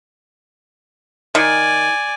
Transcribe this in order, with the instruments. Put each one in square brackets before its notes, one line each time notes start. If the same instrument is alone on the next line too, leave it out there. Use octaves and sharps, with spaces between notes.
[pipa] D#3 [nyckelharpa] D5 G#5